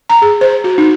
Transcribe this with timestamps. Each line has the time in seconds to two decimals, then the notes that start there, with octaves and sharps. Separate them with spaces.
0.10 A#5
0.22 G#4
0.41 C5
0.64 F#4
0.78 D#4